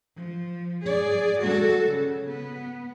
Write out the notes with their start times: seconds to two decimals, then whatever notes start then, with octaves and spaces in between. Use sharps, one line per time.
0.16 F3
0.84 G#4 D5
1.39 F#4 A4
1.89 C#3
2.29 B3